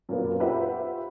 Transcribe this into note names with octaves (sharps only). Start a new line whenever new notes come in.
F#2 A#2 B3
F4 G4 B4 C5 E5 F#5